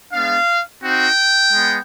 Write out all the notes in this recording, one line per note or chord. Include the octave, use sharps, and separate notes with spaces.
G#3 B3 D4 F5
C4 D#4 F#4 G5
G#3 B3